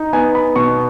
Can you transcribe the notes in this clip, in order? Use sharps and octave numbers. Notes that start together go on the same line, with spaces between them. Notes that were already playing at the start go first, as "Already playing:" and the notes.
Already playing: D#4
B3 G#5
B5
B2 C#6